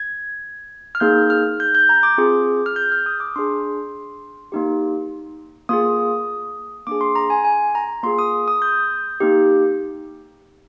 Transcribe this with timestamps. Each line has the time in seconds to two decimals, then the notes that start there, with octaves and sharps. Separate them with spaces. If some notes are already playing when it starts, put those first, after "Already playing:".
Already playing: G#6
0.95 F6
1.00 A#3 D#4 G#4 G6
1.30 F6
1.60 G6
1.75 G6
1.89 A#5
2.03 D6
2.18 C4 F4 G#4
2.66 F6
2.76 G6
2.92 F6
3.06 D#6
3.20 D6
3.36 D4 G#4 C6
4.52 A#3 D#4 G4
5.69 A#3 F4 G#4 D#6
6.87 A#3 D4 G#4 D6
7.01 C6
7.16 A#5
7.30 G#5
7.45 G#5
7.75 A#5
8.03 A#3 F4 G#4 C6
8.19 D#6
8.48 D#6
8.62 G6
9.20 A#3 D#4 G4